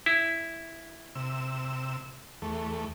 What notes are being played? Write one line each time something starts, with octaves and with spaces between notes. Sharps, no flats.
E4
C3 E6
E2 A3